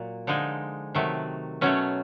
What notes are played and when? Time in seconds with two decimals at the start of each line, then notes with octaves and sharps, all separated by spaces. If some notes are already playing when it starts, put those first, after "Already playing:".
Already playing: A#2 F#3
0.27 D3 F3 G#3 D#4
0.95 C3 D#3 F#3 A3
1.61 B2 F#3 A3 C#4